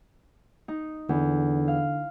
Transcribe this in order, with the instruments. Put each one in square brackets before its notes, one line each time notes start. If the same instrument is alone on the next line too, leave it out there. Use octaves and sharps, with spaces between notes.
[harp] D#4
[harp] E2 [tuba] D3
[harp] F5